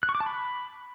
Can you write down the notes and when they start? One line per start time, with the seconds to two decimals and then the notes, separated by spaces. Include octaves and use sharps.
0.03 F#6
0.09 C#6
0.15 D6
0.20 A5
0.26 B5